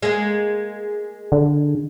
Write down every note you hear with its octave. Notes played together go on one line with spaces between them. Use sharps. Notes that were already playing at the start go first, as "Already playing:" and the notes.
G#3 A#3
D3